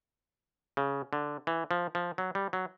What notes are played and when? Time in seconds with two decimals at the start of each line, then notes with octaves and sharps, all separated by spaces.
0.77 C#3
1.13 D3
1.47 E3
1.71 F3
1.95 F3
2.18 F#3
2.35 G3
2.53 F#3